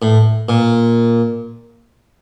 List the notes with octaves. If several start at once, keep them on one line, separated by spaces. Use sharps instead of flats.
A2
A#2